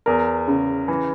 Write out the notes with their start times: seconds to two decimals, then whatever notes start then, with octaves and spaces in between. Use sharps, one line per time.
0.06 E2 A#4
0.48 C#3
0.88 E3